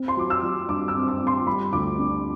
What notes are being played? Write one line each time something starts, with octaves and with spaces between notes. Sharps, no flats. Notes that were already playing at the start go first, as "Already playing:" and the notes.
Already playing: C4
C6
F#3 D6
E6
F#3
G2 D6
E6
C4
D6
C4
C6
G3 B5
D2 D6
D4